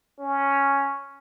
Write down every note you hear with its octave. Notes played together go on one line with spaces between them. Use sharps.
C#4